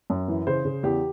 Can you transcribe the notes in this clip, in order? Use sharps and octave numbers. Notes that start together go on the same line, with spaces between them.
F#2
E3
C#3 C5
C#3
E2 G4